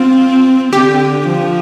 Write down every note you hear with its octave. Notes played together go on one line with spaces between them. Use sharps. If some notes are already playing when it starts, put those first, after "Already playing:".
Already playing: C4 F4
D3 G4
F3